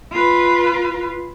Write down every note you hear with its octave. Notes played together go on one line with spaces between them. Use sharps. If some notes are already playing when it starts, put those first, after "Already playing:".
F4 B4